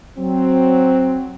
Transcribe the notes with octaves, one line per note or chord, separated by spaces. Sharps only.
F#3 C4